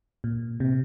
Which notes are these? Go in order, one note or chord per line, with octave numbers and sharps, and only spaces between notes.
A#2
C3